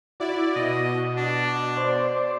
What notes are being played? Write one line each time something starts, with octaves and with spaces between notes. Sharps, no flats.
E4 F#4 D5
B2 D#5
D4
C5 D5